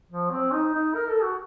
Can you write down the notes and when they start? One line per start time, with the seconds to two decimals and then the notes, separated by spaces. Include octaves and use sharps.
0.11 F3
0.31 C4
0.52 D#4
0.74 D#4
0.95 A#4
1.09 A4
1.23 F#4